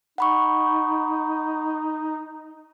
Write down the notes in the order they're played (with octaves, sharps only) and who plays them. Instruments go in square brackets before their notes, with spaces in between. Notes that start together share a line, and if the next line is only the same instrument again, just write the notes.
[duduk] D#4 [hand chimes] F#5 B5 C#6